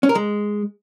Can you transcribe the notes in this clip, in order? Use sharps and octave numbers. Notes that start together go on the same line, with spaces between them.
C#4
A#4
G#3